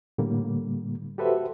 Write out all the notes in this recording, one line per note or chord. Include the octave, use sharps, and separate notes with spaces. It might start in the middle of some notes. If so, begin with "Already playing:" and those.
A2 D3 G3 A#3
F#4 G4 A4 B4 C5 E5